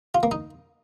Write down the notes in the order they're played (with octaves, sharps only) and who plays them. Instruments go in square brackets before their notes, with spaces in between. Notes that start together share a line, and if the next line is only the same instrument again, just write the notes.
[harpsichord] F4
A#3
D#4